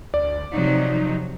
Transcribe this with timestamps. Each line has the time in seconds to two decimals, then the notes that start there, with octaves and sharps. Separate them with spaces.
0.14 D2 D5
0.53 C3 F3 F#3 D#4